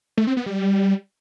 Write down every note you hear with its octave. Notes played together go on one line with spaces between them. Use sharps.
A3
C4
B3
G3